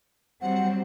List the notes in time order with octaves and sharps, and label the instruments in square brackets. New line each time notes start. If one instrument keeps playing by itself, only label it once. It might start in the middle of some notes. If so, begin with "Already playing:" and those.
[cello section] F#3 G3 C4 [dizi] F#5